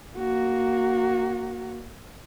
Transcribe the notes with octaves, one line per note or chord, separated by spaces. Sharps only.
A#3 F#4